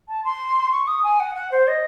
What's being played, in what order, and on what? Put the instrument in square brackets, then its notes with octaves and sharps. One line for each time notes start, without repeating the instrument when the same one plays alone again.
[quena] A5
C6
C#6
D#6
G#5
F#5
F#5
C5
D#5